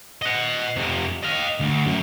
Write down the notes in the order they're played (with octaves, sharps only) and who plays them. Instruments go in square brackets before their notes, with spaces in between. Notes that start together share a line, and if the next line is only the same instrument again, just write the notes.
[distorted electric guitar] D#5 F#5
F2 C3
D#5 F5
D2
F#2